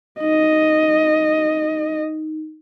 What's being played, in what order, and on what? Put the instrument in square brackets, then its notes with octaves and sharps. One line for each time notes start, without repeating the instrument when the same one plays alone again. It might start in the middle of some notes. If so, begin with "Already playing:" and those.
[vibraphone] D#4 [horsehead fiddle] D#5